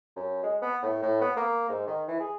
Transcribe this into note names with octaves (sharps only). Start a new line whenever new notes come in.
F#2
G#3
B3
A2
A2
B3
A#3
G#2
D#3
E3
G#4